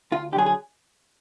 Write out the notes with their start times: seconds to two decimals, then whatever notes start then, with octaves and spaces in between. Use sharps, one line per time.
0.12 D2 F4
0.32 D3 G4
0.36 F#3 G#4
0.46 G#4